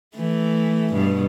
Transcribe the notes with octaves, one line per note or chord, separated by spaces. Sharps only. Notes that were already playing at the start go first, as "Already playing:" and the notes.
E3 A3
G2 B2